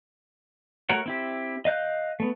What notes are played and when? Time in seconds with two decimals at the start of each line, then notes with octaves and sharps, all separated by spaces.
0.89 A3 F#4 A#4 C#5 F#5
1.06 C4 E4 G4
1.65 D#5 F5 F#6 G6
2.20 A3 B3